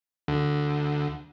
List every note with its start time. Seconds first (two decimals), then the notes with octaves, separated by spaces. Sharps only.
0.28 D2 D3